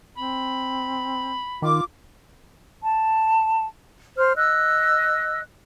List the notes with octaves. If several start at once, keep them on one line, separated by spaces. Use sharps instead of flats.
C4 B5
D#3 F4 D6
A5
C5 F6
D#5 E6 F#6